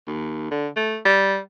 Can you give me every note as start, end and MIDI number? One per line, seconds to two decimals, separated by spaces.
0.07 0.50 39
0.51 0.68 50
0.76 0.97 57
1.05 1.39 55